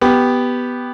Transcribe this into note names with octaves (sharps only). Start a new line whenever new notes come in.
B3 G4